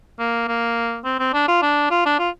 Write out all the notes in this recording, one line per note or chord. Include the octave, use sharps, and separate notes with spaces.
A#3
A#3
C4
C4
D4
F4
D4
F4
D4
F4